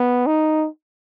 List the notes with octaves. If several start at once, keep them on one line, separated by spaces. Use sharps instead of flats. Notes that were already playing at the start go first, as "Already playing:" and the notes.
Already playing: B3
D#4